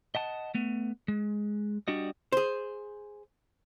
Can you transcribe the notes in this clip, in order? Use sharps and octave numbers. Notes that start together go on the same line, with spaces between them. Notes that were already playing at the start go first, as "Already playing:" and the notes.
D#5 F#5 A5
A3 B3
G#3
G3 D4 F#4 D#5
G#4 C5